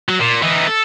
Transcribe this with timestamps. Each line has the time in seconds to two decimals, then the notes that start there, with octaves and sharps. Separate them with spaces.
0.09 F#3
0.20 A#2
0.42 E3 D#4
0.67 A4